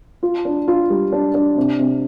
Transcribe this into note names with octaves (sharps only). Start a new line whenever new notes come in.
F4
D4
F4
G3
D4
D4
C3
C3